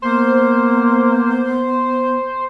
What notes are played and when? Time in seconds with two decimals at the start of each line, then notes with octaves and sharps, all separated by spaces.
0.02 A#3 B3 C5